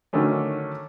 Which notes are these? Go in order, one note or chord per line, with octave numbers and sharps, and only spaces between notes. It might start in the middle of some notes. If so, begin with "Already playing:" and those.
D3 D#3 F#3 A3 C#4